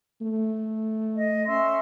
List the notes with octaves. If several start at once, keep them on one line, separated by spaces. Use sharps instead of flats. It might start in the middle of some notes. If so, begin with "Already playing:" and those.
A3
D#5
C#4 E5 C6